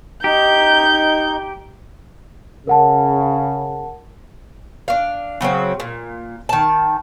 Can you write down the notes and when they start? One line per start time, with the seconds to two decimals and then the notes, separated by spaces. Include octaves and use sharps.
0.24 D#4 G4 G6
2.67 C#3 A#4 F#5 A5
4.88 D4 F5
5.41 C#3 F#3 B3 C4
5.80 A#2
6.49 D#3 A5